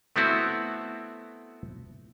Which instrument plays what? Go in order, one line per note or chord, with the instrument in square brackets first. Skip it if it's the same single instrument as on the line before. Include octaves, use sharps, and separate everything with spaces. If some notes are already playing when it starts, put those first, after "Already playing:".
[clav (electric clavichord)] A3 B3 C4 E4 F#4